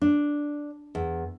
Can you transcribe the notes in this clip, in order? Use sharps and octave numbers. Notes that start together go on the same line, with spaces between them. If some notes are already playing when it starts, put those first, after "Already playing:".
D4
E2